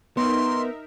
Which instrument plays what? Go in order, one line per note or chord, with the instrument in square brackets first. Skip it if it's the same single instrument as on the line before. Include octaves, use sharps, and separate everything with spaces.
[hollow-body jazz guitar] B3 [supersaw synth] D#4 A#4 E5 [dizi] C6